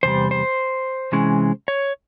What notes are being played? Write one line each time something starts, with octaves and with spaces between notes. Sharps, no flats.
E2 C3 G3 C5
C5
C3 E3 G#3 C#4
C#5